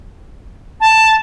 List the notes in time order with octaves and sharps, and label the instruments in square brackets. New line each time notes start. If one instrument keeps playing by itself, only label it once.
[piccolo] A5